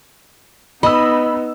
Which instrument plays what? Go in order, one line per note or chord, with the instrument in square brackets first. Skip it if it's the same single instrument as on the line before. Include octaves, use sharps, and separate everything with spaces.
[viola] B3 D#4 [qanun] D#5 [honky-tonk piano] B5 E6